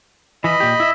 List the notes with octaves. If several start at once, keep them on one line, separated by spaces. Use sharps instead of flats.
E3 D#5 B5
A#2 G4
E4 E5